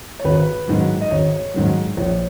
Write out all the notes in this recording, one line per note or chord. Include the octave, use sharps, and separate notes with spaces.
C#5
G#1 B4
G#2 D#3 F#3
D#5
G#1 C#5
G#2 D#3 F#3
A#1 C#5